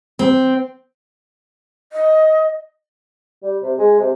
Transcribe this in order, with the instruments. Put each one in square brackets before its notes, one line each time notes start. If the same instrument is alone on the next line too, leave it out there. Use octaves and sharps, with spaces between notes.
[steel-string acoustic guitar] C4
[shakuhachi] D#5
[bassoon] G3
C3
G#3
C3